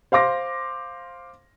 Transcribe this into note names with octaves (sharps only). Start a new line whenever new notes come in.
C5 F5 C6 D6 A#6